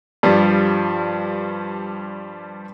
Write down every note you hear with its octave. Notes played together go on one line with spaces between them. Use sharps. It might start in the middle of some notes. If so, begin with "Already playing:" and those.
G2 F3 G3